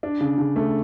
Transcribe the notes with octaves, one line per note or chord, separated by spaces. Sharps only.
D4
C#3
C#3
A3